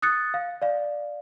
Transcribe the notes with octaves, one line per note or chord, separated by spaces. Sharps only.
D#6 F#6 A6 C#7
F5
D5 F5